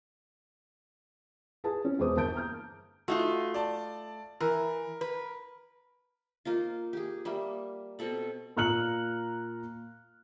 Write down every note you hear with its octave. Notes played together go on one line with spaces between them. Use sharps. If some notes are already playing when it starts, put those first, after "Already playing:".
G#4 B4 A5
C#4
E1 G#4 B4 C5 D6 D#6
G1 A#3 A5 G6 D7
A#5 F6 G6
A3 D#4 F4 F#4
D5 A5
E3 A#4
B4
A#3 D#4 F4
G4 G#4
G3 A#3 E5
B2 C4 A4 B5
A#2 A#5 F6 F#6 C#7 F#7